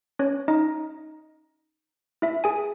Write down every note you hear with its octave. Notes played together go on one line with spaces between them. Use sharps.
C#4 C#5
D#4 D#5
E4 E5
G#4 G#5